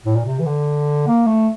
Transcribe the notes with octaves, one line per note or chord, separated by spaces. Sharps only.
A2
A#2
C3
E3
D3
A#3
A3